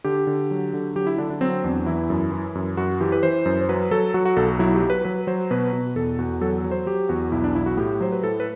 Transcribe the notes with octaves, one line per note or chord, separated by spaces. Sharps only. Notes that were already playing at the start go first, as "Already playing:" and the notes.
D3 G4
D3
F#3
D3
F#3 G4
E4
D3 D4
D4
F#3 C4
E2 D4
E3 E4
F#2
E3
F#2
F#2 F#4
E3 G4
B4
E3 C5
F#2
C5
F#3 B4
F#3 A4
F#3 F#4
F#4
B1 A4
F#4
F#3 E4
G4
F#3
B4
F#3 B4
F#3 C5
B2 B4
B2
E2 A4
E2 F#4
F#3 A4
F#3
C5
F#3 G4
E2 F#4
B1 E4
D4
B1 E4
F#4
A2 G4
F#3 C5
B4
A2 A4
B4